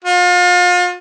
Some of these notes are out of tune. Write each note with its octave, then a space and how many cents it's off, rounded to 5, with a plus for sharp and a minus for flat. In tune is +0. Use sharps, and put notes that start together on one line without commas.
F4 +35